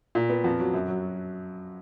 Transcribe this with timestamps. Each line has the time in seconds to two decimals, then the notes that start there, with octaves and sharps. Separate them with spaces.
0.15 A#2
0.30 B3
0.44 F2
0.60 F#3
0.74 F#2
0.88 F#3